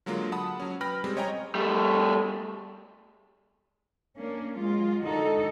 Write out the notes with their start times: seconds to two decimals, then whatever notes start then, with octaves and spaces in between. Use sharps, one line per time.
0.06 D3 F#3 G#3 A#3 F4
0.32 F#5 A5 B5 D#6
0.60 F#3 C#4
0.81 B4 G5 B5 F6 A#6
1.04 G3 G#3 C4
1.17 C#5 D#5 G5 G#5 A#5
1.55 G3 A3
4.17 A#3 C#4 D4
4.56 F#3 G#3 F4
5.03 D3 D#3 D#4 F#4 A4